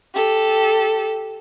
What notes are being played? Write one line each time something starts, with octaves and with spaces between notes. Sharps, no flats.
G4 A4